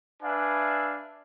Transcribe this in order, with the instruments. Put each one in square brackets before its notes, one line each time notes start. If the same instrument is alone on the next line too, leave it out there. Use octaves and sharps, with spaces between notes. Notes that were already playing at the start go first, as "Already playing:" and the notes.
[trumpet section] D4 B4 E5 F5 G#5